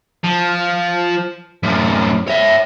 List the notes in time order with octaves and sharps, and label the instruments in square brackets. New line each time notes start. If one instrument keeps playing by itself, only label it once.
[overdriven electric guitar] F3
F#2 A2
C#5 E5